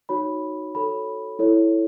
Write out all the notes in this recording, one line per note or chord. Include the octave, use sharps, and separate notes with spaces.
D#4 F#4 C#5 B5
F#4 A4 C#5 B5
E4 A4 C#5